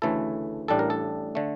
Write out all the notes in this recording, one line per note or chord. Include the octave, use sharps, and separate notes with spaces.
D2 C#3 E3 A3 E4 A4
A1 A2 G3 D4 A4
A#4
A4
D3 A3